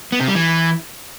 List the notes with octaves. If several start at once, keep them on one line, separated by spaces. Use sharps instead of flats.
B3
C3
G3
E3